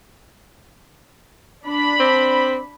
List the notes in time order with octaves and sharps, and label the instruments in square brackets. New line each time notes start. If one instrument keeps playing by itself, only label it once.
[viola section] D4 B5
[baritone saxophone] C4